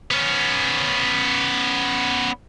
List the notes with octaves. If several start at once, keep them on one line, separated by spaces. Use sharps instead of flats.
B3 C#4